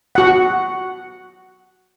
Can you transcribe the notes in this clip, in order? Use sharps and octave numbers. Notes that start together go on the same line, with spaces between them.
F#4 F#5